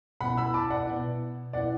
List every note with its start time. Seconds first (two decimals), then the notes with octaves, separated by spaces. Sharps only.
0.21 B2 B3 E4 F#5 B5
0.37 B5 E6
0.54 A5 D6
0.70 D5 F#5
0.87 B2 B3 E4
1.53 B2 B3 E4 D5 F#5